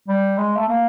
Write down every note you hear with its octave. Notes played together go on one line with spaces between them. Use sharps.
G3
G#3
A3
A#3